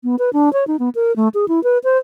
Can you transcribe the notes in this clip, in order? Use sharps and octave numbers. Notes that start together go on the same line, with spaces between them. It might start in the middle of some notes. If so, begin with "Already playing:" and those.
B3
B4
D4
C#5
D#4
B3
A#4
A3
G#4
E4
B4
C5